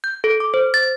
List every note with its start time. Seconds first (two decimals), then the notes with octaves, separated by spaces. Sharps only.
0.04 G6
0.24 A4
0.40 D6
0.54 C5
0.74 A6